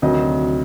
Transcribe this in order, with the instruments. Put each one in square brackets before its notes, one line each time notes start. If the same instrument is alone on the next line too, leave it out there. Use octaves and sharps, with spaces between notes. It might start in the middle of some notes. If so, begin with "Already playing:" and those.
[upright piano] D2 C3 D#3 F#3 D#5